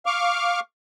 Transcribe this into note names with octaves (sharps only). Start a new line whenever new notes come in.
F5 C#6 D6 F6